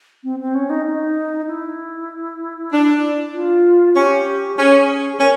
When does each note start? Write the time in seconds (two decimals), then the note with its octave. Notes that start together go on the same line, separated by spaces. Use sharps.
0.24 C4
0.40 C4
0.55 C#4
0.70 D#4
0.86 D#4
1.47 E4
2.72 D4
3.34 F4
3.96 C#4 G4
4.57 C#4 G#4
5.19 C#4 A#4